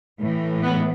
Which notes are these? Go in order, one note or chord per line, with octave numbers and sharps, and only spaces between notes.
A2 E3
B3